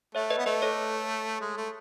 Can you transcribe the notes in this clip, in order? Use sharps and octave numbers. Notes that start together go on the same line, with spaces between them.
A3 C#5 E5
B4 D#5
B3
A3 B4 D#5
A4 C#5
G#3
A3